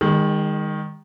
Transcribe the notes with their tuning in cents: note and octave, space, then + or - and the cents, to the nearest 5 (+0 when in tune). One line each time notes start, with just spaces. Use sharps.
D#3 +0 G#3 -35